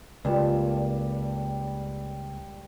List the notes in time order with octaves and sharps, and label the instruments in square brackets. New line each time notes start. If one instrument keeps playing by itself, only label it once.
[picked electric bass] C#2 [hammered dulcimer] A#2 G3 A5